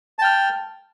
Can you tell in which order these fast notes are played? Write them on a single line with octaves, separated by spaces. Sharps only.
A5 G5 F6